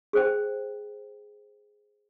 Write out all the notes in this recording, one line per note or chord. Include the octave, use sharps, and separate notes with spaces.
G#4 C5 G5